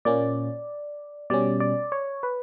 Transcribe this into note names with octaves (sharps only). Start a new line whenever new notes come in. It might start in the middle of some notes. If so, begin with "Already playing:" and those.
A#2 A#3 C#4 D5
B2 G3 C#4 D5
D5
C#5
B4